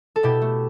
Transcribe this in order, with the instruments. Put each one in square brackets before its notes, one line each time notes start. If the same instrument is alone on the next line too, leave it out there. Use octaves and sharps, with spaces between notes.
[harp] A4
B2 E4 G4
A3